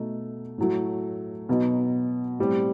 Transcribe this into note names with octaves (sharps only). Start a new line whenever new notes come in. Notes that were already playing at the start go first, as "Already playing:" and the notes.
Already playing: B2 A3 D#4
A2 F#3 A3
B2 F#3 B3 D#4
A2 G3 C4